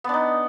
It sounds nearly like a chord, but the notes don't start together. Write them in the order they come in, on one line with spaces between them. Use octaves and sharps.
B3 D4 D#4